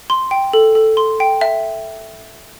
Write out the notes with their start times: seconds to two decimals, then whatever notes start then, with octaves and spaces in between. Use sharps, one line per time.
0.10 C6
0.31 G5
0.53 A4
0.75 A4
0.97 C6
1.20 G5
1.41 E5